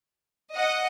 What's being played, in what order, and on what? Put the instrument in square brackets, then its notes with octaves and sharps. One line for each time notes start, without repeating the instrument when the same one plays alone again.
[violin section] D#5 F#5